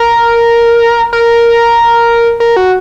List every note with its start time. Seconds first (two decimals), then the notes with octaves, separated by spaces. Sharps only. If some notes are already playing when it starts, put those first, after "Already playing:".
Already playing: A#4
1.13 A#4
2.40 A#4
2.56 F#4